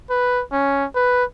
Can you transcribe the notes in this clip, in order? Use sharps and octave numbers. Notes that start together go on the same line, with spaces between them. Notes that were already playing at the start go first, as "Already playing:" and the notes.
B4
C#4
B4